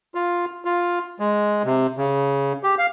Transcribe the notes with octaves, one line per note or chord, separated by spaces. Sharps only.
F4
F4
G#3
C3
C#3
G4
F5